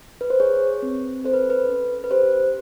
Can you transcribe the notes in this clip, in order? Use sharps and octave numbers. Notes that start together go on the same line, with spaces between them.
B4
C5
G#4 C#5
C4
A4 C5
B4
B4
C#4
B4
G4 C5